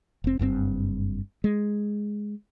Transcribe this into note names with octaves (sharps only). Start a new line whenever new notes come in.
F1 C4
F#1 G2 C3 C4
G#3